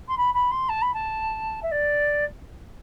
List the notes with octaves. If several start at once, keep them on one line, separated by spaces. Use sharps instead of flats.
C6
B5
B5
C6
A5
B5
A5
E5
D5